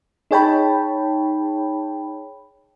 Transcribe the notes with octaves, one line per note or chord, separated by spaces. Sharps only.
D#4 G#4 C#5 G5 A5 B5